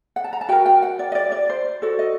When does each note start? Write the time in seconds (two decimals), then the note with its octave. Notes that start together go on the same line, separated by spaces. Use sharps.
0.16 F#5
0.24 A5
0.33 A#5
0.41 A5
0.49 F#4 A#4 G5
0.66 G5
0.82 F#5
0.99 D5
1.12 D#5
1.15 D5
1.32 D5
1.49 C5
1.82 F#4 A4 D5
1.99 D#5